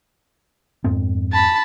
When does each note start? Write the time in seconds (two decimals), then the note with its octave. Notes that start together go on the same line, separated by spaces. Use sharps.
0.84 F2 G#2 C4
1.33 A5 B5